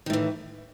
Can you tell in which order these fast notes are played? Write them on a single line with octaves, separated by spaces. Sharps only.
D#3 A2 E3